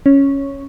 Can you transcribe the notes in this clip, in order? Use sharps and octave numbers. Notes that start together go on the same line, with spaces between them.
C#4